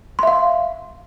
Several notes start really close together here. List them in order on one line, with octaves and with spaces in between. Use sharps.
C6 E5 F5